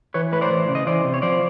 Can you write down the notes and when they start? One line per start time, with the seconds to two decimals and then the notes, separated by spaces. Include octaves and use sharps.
0.14 E3 B4 C#5
0.32 A2 B4 C#5
0.41 C5 D5
0.51 E3
0.68 C#3
0.75 D#5
0.87 E3 C5 D5
1.04 C3
1.14 C#5
1.22 F3 C5 D5